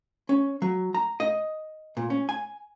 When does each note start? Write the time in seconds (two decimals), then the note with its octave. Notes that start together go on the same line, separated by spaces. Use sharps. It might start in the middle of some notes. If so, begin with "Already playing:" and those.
0.29 C#4
0.62 F#3
0.94 A#5
1.20 D#5
1.97 A#2
2.10 C#4
2.29 G#5